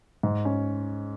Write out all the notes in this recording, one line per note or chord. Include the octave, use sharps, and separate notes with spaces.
G#2
C#4